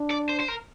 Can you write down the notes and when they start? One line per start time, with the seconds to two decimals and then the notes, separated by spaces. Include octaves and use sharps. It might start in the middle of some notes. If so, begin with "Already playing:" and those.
Already playing: D4
0.11 D5
0.29 C5
0.40 C5
0.48 A#4